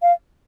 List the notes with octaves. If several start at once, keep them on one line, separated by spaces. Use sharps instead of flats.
F5